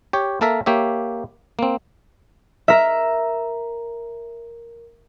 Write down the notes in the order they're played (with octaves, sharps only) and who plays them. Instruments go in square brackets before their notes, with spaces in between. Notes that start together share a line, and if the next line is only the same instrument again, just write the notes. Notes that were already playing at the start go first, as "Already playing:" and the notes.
[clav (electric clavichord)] G4 C#5
A#3 A4 A#4 E5
A#3 G4 C#5 E5
A#3 C4
[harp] A#4 E5